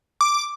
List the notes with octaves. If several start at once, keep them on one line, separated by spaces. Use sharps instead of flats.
D6